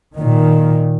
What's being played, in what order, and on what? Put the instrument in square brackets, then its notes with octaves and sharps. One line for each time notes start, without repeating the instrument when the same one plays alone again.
[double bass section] A#2 D#3